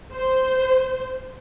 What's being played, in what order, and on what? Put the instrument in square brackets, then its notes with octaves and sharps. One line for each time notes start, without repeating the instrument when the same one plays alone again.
[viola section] C5